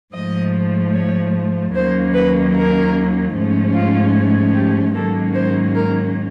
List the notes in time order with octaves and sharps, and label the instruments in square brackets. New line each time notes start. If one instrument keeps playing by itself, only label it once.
[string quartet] G#2 F3 A3 D#5
C#5
D#2 D#3 F#3 A#3 C#4 C5
B4
A#4
G#2 F3 A3 C#4
F4
G4
G#2 D#3 F#3 A#3 C#4 A4
C5
A#4